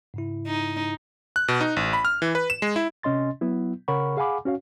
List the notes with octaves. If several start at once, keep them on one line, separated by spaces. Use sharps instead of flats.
G#2 C#3 E4
D#4
F#6
B2
D#4
A1
B5
F6
E3
B4
E7
G#3
E4
C3 C#4 D#5 C6 A6
F#3 B3 E4
C#3 A#4 C#5 F#5 B5 C#6
G#4 F5 F#5 G#5 B5 D6
C#4 F#4 C#5 F5